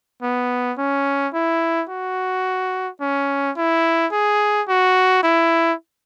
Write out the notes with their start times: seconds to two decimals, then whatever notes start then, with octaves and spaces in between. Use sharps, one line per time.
0.23 B3
0.78 C#4
1.34 E4
1.89 F#4
3.01 C#4
3.57 E4
4.12 G#4
4.68 F#4
5.23 E4